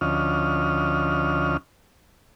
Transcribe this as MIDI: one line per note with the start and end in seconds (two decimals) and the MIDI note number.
0.01 1.57 38
0.01 1.57 53
0.01 1.57 61
0.01 1.57 75
0.01 1.57 89